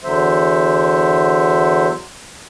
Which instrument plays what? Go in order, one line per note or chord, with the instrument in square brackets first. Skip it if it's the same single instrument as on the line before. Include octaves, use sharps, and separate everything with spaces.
[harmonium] E2 D3 F#3 C5 E5